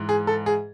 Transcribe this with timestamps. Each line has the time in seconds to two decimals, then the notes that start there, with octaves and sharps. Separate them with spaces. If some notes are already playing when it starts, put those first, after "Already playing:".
Already playing: G#2 E3
0.09 G#4
0.27 A4
0.46 G#4